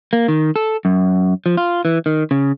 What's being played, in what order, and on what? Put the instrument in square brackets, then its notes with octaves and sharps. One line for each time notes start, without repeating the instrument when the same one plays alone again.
[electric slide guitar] A#3
D#3
A4
F#2
F3
F4
E3
D#3
C#3